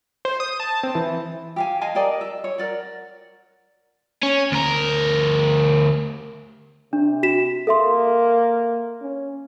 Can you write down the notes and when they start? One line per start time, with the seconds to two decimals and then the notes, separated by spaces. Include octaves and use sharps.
0.25 C5
0.40 D#6
0.60 A5
0.83 C4
0.95 E3
1.56 G4 F5 G#5
1.81 D#5 F5 G#5 A5
1.95 G4 A#4 D5 D#5
2.21 E5
2.44 C#5
2.58 A#4 D5 F#5
4.23 C#4
4.52 D2 A#4
6.93 C3 D4
7.23 F#4 B6 E7
7.67 A#3 A4 E5 C6
9.01 C#4